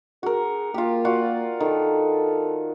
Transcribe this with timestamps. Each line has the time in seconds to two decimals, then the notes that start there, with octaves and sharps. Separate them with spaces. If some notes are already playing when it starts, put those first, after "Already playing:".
0.23 F#4 G#4 A#4
0.74 A#3 F4 G4
1.05 F4 F#4 D5
1.60 D#3 A4